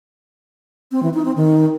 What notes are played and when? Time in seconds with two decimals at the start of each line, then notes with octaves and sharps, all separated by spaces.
0.92 C4
1.03 E3
1.14 D#4
1.25 C4
1.36 D#3